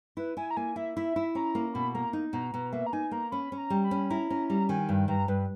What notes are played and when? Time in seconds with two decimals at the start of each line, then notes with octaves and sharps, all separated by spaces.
0.17 E4 B4
0.37 E4 G#5
0.51 A#5
0.57 A#3 G#5
0.76 E4 E5
0.96 E4 E5
1.16 E4
1.35 C#4 A#5
1.55 A#3
1.74 B2 B5
1.94 A#3 A#5
2.13 D#4
2.33 B2 A#5
2.53 B2 A#5
2.73 A#3 E5
2.86 A#5
2.93 D#4 G#5
3.11 A#3 A#5
3.32 C#4 B5
3.52 C#4
3.58 A#5
3.70 G3
3.84 B5
3.91 C#4
4.10 E4 A#5
4.30 C#4 A#5
4.49 G3 A#5
4.69 D#3 G#5
4.89 G2
5.08 G2 A#5
5.28 G2 B4